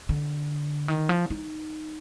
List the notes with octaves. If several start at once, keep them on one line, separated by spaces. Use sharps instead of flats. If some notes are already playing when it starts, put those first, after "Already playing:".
D3
D#3
F3
D#4